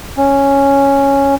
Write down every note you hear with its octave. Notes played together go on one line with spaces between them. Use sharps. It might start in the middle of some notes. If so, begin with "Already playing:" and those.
C#4